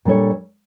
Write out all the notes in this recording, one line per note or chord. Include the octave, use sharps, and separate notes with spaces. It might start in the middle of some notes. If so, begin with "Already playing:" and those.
A#2 G3 D4 A4 C#5